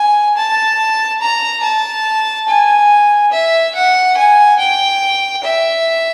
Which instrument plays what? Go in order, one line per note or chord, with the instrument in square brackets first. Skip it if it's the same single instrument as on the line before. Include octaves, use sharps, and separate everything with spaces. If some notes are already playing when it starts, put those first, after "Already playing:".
Already playing: [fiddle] G#5
A5
A#5
A5
G#5
E5
F#5
G#5
G5
E5